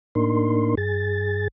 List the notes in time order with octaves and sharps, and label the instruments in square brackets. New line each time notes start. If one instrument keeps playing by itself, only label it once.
[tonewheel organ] A2 A#3 D4 D#4 A#4 C6
G2 G#4 A6